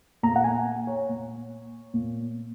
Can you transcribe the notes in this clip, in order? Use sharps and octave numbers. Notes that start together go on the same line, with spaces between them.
A#2 A#5
F#5
G#5
C#5
A#2
A#2